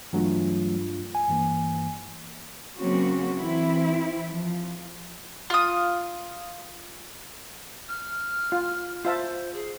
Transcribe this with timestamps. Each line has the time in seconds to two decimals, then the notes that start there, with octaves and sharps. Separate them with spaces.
0.13 G2 E3 F#3 A3 D4 F4
1.15 G#5
1.28 G2 E3 A#3
2.78 C#3 F#3 A#3 C4 C#4 F#4
3.36 E3 C4 E4
4.30 F3
5.50 F4 D#6
7.89 F6
8.52 F4
9.05 F4 C5 E5 A5
9.54 G#4